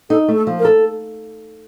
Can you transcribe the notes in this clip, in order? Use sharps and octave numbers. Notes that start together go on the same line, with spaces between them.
D#4 A4
A3
A4
F3
A#4
A4